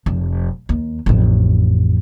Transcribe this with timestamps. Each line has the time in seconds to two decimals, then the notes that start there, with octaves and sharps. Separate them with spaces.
0.06 F1
0.69 D#2
1.06 A1 F2